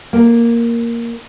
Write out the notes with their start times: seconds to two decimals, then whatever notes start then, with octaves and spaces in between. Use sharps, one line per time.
0.13 A#3